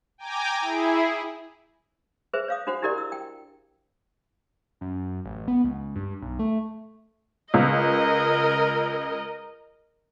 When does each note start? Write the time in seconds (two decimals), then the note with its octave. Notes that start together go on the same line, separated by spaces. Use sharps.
0.18 G5 G#5 A#5 D6
0.61 E4 G#4
2.33 G#4 B4 C5 E5
2.48 C#5 F5 D#6
2.67 D4 F#4 C5 F#5
2.82 D4 E4 G4 A#4 D5 D#5
2.98 E6
3.12 G5
4.81 F#2
5.25 A1
5.48 B3
5.64 C#2
5.96 G2
6.22 B1
6.39 A3
7.54 C#2 A#4 D#5